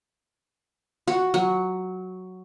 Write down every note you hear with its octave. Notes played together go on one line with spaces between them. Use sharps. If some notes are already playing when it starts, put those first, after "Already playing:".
F#4
F#3